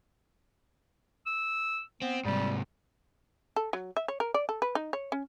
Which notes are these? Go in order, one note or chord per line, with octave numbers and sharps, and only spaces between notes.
E6
B3 C4
G#2 C3 G3
A4
F#3
E5
C#5
A#4
D5
A4
B4
D#4
C#5
C#4